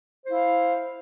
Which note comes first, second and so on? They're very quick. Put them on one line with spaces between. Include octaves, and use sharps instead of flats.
C5 E4 F5